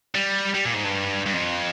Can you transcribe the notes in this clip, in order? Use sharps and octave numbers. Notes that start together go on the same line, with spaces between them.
G3
G3
A#2
G#2
G2
G2
F2